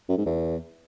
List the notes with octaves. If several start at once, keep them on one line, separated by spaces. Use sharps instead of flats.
F#2
G#2
E2